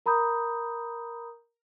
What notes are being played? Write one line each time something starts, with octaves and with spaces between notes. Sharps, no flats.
A#4 A#5 B5 D#6 G6